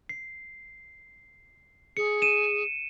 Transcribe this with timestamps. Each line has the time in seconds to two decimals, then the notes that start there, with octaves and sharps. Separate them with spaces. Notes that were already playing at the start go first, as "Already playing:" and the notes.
0.09 C7
1.97 G#4 C#7
2.22 D#7 E7